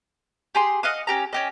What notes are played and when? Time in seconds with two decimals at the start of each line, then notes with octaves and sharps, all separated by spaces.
0.55 G4 G#4 C6
0.83 D#5 F5 F#5 D#6
1.07 C#4 G4 A#5
1.33 C#4 G4 D#5